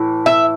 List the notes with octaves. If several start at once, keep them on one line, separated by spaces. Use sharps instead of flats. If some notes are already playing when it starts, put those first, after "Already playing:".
Already playing: A2 E3
E5